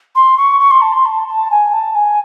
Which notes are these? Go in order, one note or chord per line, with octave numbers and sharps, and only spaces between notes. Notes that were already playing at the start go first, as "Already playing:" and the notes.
C6
C#6
C#6
C6
A5
C6
A5
A5
G#5
A5
G#5